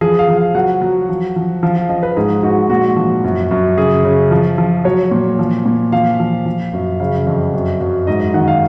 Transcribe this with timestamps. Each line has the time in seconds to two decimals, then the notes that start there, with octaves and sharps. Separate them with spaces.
0.01 F3 G#4
0.19 F5
0.28 F3
0.37 F5
0.55 F#3 F#5
0.82 F#3
1.09 F3
1.36 F3
1.63 F3 F5
1.76 F5
1.89 F3 D#5
2.03 B4
2.17 G#2 G#4
2.43 G#2 F#4
2.70 A#2 F#4
2.96 F3
3.24 F#2
3.51 F#2
3.78 C#3 G#4
4.04 C#3
4.31 F3
4.58 F3
4.85 F#3 C#5
5.11 A#2
5.39 F3
5.66 A#2
5.92 F3 F5
6.20 F3
6.46 F3
6.73 F#2
7.00 C#3 F5
7.27 F2
7.54 F#2
7.81 F#2
8.07 G#2 D#5
8.21 D#5
8.34 D#3 F#5
8.48 F5